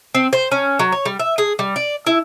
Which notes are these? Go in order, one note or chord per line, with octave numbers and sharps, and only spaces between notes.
C4
C5
C#4
F#3
C#5
G3
E5
G#4
G3
D5
E4